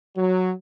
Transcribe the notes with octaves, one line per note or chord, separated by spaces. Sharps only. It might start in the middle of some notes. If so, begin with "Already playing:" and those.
F#3